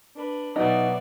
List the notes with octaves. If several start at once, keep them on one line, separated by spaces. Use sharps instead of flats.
D4 B4
B2 F#3 B3 D#4 D5 E5